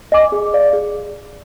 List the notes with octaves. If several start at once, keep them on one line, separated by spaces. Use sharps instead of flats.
D#5 G#5 D6
G#4
D5 F5
G#4